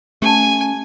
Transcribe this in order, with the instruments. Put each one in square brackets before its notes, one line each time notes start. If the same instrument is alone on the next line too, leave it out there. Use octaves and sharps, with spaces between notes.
[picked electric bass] A3 [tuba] C#4 [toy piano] G4 A5 [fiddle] G#5